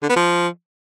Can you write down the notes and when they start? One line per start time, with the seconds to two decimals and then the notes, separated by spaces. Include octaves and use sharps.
0.02 D3
0.09 B3
0.16 F3